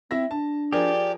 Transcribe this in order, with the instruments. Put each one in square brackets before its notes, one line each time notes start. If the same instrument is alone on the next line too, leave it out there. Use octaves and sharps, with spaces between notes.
[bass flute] C4 [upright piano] E4 E5 A#6
[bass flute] D4 [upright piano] A5
[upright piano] F3 G#4 A#4 [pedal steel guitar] G4 [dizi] D5